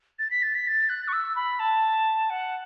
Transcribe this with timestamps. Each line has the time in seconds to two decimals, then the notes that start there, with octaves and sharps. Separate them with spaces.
0.19 A6
0.31 B6
0.42 A6
0.55 B6
0.67 A6
0.89 F#6
1.08 C#6
1.13 E6
1.36 B5
1.59 A5
2.30 F#5